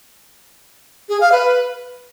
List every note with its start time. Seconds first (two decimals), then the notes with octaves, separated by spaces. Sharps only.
1.09 G#4
1.20 F5
1.32 B4